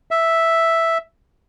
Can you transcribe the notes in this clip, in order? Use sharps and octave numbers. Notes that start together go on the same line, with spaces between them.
E5